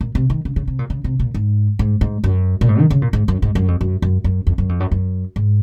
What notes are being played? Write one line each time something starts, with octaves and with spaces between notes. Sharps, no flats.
A#2
C3
D#3
C#3
C#3
C3
A#2
C#3
C3
A#2
G#2
G#2
G#2
F#2
A#2
G#2
D#3
C#3
A#2
G#2
F#2
G#2
F#2
F2
F#2
F#2
F#2
F2
F#2
F2
F#2
F#2
G#2